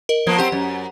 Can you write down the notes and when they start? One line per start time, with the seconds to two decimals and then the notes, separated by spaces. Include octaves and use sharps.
0.09 A#4 D#5
0.27 F3 A#3 B3
0.38 F#3 C4 G4 C5 F#5
0.52 F#2